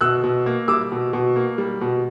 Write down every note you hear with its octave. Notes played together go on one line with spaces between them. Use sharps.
B2 E6 F#6
B2
A#3
G3 D6 E6
B2
B2
A#3
G3
B2